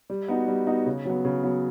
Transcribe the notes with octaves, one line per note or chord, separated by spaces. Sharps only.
G3
B3 D#4 F#4
G3
B3 D#4 F#4
C#3
F#3 B3
C#3
F#3 B3